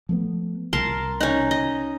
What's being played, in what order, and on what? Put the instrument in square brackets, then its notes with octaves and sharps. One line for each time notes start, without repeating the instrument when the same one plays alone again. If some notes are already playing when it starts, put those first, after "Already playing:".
[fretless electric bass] F3 A3 B3
[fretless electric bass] C2 [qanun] A#4 A5 C6
[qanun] C#4 D#4
D#5